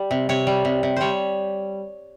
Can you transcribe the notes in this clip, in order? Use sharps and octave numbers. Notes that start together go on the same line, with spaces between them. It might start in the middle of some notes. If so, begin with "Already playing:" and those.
Already playing: G3
C3
C3 C#5
G3
C3
C3
G3 C5 C#5